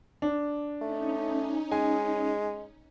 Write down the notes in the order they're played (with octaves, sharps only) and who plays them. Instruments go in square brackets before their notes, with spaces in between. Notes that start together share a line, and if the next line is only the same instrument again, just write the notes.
[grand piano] D4
[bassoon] A3 [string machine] C#4 D#4
[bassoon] G#3 [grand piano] G#5